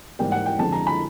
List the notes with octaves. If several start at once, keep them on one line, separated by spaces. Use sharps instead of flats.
G#2 E3 G3 A#3 G5
F#5
G5
F2 D3 F3 G#3 A5
A#5
B5